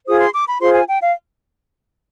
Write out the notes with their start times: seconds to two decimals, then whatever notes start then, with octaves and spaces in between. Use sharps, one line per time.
0.07 F4 G#4 C5 D#6
0.20 C6
0.34 D6
0.48 B5
0.61 F4 G#4 C5 C6
0.74 G#5
0.88 G5
1.01 F5